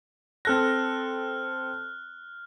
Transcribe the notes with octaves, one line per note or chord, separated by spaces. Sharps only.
C4 A4 F6 F#6 A#6